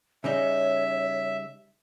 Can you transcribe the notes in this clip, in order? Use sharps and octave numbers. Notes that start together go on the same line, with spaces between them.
C#3 G3 D#4 C#5 E5